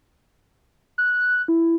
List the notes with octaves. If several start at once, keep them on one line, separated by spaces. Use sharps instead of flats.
F#6
E4